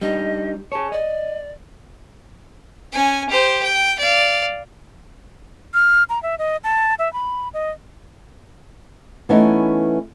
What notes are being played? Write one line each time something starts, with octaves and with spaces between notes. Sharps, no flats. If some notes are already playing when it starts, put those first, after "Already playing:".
G3 D4 D#4 D#5
G#4 C#5 A5
D5 D#5
C#4 G#5
G4 C5
G5
D5 F5
F6
A#5
E5
D#5
A5
E5
B5
D#5
E3 A3 B3 C#4 D#4 E4